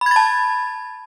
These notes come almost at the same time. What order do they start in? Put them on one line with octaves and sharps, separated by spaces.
B5 G#6 A6 A5